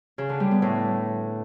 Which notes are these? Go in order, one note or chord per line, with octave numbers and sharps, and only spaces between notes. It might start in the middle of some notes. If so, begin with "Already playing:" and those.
C#3
D3
G3
B3
A2